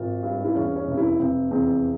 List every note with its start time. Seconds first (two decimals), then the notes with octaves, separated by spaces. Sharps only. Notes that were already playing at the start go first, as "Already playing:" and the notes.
Already playing: G#1 F4
0.23 G2
0.44 E4
0.55 E2 C#4
0.76 C#4
0.87 F1
0.97 E4
1.19 F1 C4
1.51 E2 C4